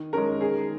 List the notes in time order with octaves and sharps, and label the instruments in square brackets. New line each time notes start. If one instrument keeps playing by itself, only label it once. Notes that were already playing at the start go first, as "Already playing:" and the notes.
Already playing: [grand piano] D#3
[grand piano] G#3 C#4 [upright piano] A#4
[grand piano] D#3 [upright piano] G#4